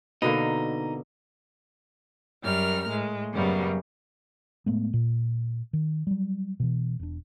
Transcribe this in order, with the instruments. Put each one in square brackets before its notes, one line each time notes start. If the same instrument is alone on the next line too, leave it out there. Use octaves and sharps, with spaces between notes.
[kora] B2 D3 A#3 [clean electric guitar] D#4
[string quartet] F#2 G3 A#4 F6
A2 G#3
F#2 C#3 F#3 G3 A#3 B3
[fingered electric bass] A2 G#3 A3 B3
A#2
D#3
F#3 G3
B2 E3
E1 D4